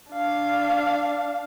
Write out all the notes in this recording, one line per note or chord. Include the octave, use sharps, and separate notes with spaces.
D4 F5